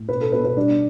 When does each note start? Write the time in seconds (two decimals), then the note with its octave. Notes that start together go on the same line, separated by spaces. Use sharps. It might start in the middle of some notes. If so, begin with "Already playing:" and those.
Already playing: A2
0.09 B2 B4
0.21 A4
0.32 B2 B4
0.44 B4
0.57 G3 D4